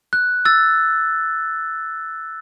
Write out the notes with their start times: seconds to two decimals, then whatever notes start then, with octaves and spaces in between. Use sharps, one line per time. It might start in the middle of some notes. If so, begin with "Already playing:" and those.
0.13 F#6
0.45 E6 A6